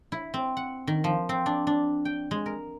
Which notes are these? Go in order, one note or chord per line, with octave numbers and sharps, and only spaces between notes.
E4
C4
F#5
D#3
F3
C4
D4
D4
G5
G#3
A#4